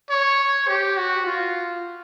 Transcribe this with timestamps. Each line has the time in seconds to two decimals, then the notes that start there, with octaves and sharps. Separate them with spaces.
0.10 C#5
0.68 G4
0.98 F#4
1.26 F4